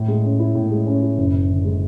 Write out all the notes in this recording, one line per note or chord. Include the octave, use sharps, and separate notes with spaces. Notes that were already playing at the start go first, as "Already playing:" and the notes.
Already playing: A2
G#3
C#4
E4
A2
G#3
C#4
E4
F#1
F#2
D3
G#3